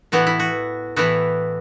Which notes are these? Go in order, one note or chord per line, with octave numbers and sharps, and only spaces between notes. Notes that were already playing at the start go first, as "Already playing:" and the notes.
A2 E3 B3 E4 F#4
E4
F#4
A2 E3 B3 E4 F#4